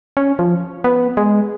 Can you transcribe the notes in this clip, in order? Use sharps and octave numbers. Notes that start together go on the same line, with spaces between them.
C#4
F3
B3
G#3